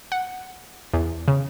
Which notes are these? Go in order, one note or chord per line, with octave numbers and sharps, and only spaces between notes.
F#5
E2
C#3